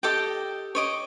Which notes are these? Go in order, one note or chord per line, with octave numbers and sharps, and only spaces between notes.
G4 A4 D#5 G5
C#5 D#5 D6